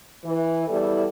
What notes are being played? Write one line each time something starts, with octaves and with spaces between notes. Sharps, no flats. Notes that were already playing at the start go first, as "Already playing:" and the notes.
E3
E2 G3 E4 A4